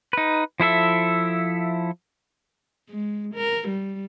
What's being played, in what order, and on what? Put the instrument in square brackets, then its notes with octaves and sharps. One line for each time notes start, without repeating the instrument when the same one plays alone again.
[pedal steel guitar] D#4 B4
F3 E4 A4 E5
[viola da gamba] G#3
A#4
G3